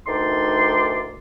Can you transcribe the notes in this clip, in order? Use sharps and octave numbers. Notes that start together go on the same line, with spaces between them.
D2 D#3 E3 D#4 D5 C6